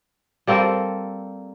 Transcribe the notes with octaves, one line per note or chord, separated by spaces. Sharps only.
G3 A#3 C4 A4